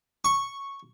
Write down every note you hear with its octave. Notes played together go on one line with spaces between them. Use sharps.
C#6